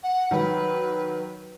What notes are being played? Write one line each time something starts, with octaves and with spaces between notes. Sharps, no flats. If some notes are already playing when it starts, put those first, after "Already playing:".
F#5
D#3 F#3 B4